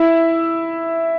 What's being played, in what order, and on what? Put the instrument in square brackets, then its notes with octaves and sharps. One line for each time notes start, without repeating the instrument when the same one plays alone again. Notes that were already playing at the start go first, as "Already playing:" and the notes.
Already playing: [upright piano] E4 E5